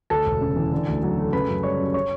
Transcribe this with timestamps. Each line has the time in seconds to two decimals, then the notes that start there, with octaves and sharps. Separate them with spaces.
0.10 D2 A4 A5
0.26 E1
0.41 C#3
0.56 E3
0.72 D3
0.87 D2
1.03 F#3
1.18 A3
1.32 C#3 B4 B5
1.48 F#2
1.63 G3 C#5 C#6
1.80 F#2
1.94 C#5 C#6